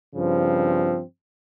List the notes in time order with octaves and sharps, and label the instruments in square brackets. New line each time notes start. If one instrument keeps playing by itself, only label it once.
[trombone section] G2 C#3 F3 C4